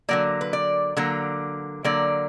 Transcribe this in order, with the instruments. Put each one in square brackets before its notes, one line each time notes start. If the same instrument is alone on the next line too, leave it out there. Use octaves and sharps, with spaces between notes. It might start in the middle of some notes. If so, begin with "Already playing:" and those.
[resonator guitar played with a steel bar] D3 F#3 A#3 D5
B4
D5
D3 F#3 A#3
D3 F#3 A#3 D5